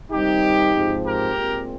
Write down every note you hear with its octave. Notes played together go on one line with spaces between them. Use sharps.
C3 D#3 G3 C4 D#4 G4
G#2 F3 C4
G4 A#4
A#2 G#3 C4